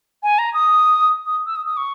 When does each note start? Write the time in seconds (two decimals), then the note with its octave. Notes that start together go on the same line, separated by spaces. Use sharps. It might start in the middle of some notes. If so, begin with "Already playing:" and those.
0.23 G#5
0.39 A#5
0.54 D#6
1.26 D#6
1.46 E6
1.56 D#6
1.66 D#6
1.77 C#6